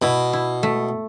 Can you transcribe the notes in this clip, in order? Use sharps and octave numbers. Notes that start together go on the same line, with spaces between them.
B2 E4
E4
A3